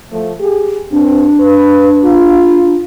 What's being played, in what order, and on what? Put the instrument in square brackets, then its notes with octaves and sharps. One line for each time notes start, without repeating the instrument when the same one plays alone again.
[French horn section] F3 A3
G4 G#4
[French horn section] G2 C4 [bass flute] D4
[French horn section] B4
F4